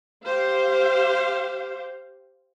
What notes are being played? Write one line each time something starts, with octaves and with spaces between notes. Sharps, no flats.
G4 C5 F5